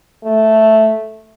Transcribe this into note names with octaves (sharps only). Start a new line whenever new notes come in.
A3